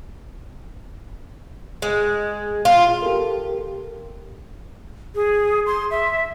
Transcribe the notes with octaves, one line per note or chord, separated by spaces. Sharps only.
G#3
F4
G4 A4 A#4
G#4
C6
E5